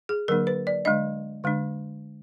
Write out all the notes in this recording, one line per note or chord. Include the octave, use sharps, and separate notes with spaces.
G#4
D3 F#3 A#3 D4 A#4
B4
D5
D3 G#3 D4 D#5
D3 G#3 D4